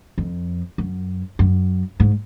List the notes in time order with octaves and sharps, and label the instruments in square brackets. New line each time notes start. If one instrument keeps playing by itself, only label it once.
[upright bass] F2
F#2
F#2
G#2